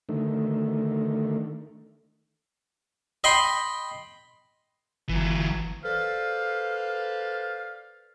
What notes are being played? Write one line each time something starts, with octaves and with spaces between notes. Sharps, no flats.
D3 D#3 A3
D#5 G5 B5 C6
G1 E3 F#3
A4 B4 C5 D5 F5